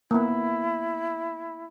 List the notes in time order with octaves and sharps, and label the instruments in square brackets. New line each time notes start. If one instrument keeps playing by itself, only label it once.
[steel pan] A#3 B3 [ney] E4